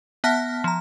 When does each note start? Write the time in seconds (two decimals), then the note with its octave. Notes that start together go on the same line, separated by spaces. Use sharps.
0.24 B3 E5 F#5 A5 F6 A#6
0.64 F3 A#5